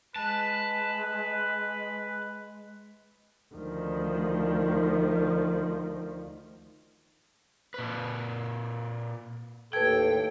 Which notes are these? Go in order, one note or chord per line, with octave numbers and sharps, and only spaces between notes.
G#3 B4 A5
D2 D#3 F3
A#2 B4
D#2 A2 A4 B4 G5 G#6